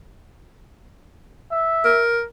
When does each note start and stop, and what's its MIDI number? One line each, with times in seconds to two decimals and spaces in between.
1.52 2.06 76
1.84 2.23 70